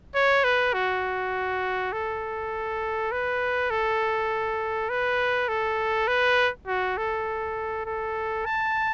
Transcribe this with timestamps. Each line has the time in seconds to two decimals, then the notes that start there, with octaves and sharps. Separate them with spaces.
0.15 C#5
0.44 B4
0.74 F#4
1.92 A4
3.12 B4
3.70 A4
4.89 B4
5.48 A4
6.08 B4
6.67 F#4
6.97 A4
7.86 A4
8.46 A5